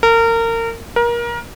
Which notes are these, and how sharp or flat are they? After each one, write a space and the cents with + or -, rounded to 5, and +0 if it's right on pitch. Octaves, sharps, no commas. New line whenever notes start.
A#4 -30
A#4 +25